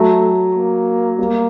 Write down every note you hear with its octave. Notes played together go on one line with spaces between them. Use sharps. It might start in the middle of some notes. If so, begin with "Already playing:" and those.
Already playing: F#3 A3
A#3
G3 A#3